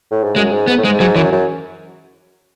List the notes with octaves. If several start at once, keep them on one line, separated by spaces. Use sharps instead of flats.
A2
G#2
F#2 G#3
G#2
G#2 B3
A2
G#2 G#3
G#2 F#3
F#2 E3
F#2